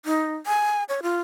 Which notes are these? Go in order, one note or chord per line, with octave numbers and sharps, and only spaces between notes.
D#4
G#5
C#5
F4